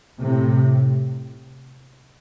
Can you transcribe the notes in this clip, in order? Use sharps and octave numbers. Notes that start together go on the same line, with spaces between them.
A2 C3